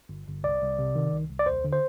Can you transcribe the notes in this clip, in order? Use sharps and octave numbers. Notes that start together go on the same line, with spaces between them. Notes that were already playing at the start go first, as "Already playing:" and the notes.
G1
G1
C2 D5
C2
C3
D#3
C2
C2
D5
D#2 C5
D3
C5